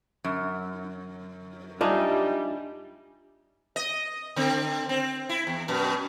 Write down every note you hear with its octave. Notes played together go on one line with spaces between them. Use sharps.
F#2
G3 D4 D#4 F4 D#5 E5 G#5
D#5
D3 C4
C4
E4
E2
F#2 B2